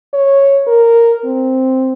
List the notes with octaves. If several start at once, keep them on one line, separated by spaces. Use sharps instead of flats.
C#5
A#4
C4